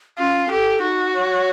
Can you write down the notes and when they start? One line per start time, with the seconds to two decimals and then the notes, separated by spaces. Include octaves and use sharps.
0.18 C#4 F4
0.50 G4 A4
0.82 D#4 F#4
1.14 C#5